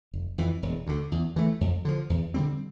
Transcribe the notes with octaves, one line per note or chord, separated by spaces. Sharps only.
F1
F2 E3
E1
D2 D3
E2
E3 A3
F2
D3 F3
E2
D3 G3 C4